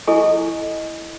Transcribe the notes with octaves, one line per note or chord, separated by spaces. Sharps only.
E4 A4 D#5 G#5 C#6